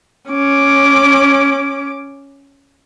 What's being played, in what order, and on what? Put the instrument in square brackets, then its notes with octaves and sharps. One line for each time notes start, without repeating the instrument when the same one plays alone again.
[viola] C#4 D6